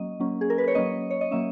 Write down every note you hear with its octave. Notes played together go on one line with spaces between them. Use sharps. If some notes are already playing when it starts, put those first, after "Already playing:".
Already playing: F#3 A#3 C#4 D#5
F#3 A#3 C#4
G#4
A#4
B4
C#5
F#3 A#3 C#4 D#5
C#5
D#5
F#3 A#3 C#4 E5